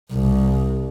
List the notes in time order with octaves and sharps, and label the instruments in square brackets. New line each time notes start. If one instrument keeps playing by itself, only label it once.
[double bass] C2